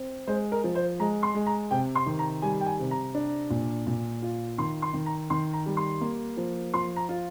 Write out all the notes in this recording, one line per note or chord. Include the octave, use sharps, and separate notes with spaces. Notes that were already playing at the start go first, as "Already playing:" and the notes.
Already playing: C4
G#3 C5
A#4
F3
C5
G#3 A#5
C6
G#3
A#5
C3 G5
C6
D#3
A#5
G3 G#5
G5
G#5
C3
A#5
D4
A#2
A#2
F4
D#3 C6
C6
D#3
A#5
D#3 C6
A#5
G3
C6
A#3
F3
F3 C6
A#5
F4